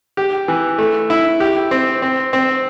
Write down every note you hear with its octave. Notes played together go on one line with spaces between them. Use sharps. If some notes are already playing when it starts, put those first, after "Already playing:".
G4
E3
A3
E4
G4
C4
C4
C4